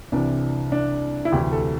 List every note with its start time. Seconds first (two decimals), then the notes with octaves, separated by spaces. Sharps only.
0.12 C2 C3 E3 D4
0.72 D4
1.25 E4
1.32 D2 C3 E3 G4
1.52 A4